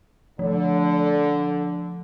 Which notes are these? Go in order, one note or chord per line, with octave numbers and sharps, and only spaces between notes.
D3 F3